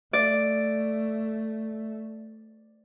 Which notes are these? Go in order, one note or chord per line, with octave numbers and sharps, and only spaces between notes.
A3 D5